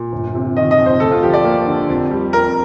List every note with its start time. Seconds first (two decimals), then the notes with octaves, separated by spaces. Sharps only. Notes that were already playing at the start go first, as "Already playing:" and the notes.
Already playing: A#2
0.12 G1
0.35 C3
0.56 D#3 D#5
0.71 D#5
0.78 F2
0.86 C5
1.00 D2 A4
1.12 F4
1.23 F3 G4
1.33 D5
1.44 A#3
1.67 D3
1.89 F2
2.11 G3
2.33 F2 A#4